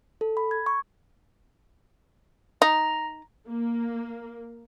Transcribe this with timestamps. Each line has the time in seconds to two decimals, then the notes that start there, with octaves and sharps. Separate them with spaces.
0.21 A4
0.37 B5
0.51 G#6
0.66 C#6
2.62 D#4 A#5
3.47 A#3